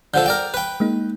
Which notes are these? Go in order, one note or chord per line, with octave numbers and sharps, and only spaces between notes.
D3 F3 A4 G6
A#4 D5 G5
B4 G5
G#3 A#3 D#4